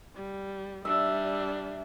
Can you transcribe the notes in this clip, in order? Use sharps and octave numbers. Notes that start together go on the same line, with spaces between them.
G3
G3 D4 E5